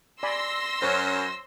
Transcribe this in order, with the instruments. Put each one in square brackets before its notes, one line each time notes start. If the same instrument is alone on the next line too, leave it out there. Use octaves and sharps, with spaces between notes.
[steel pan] D5 G#5 B5 [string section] C6 E6 A#6
[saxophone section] F#2 C#4 [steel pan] C5 C#5